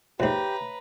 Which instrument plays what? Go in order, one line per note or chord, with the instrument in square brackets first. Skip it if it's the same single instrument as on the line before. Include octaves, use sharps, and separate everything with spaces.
[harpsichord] F2 G#2 [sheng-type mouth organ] G4 [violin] B4 A#5 [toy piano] C#5 E5